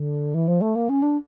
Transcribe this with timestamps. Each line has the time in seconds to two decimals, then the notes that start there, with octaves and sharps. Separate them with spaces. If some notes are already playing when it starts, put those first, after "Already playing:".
Already playing: D3
0.34 E3
0.48 F3
0.61 A3
0.75 A#3
0.89 C#4
1.02 D4